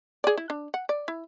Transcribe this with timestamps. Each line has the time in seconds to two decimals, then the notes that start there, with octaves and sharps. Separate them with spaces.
0.24 G#4 D5
0.38 E4
0.50 D4
0.74 F#5
0.89 D5
1.08 E4